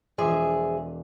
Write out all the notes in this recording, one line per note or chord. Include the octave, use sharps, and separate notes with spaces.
E1 F3 G#4 D5 E5 C6